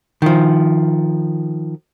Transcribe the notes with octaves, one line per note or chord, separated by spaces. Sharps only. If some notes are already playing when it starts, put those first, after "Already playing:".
D#3 F3